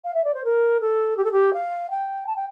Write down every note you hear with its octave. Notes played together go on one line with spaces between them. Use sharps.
F5
E5
D5
C5
A#4
A4
G4
A4
G4
F5
G5
A5
G5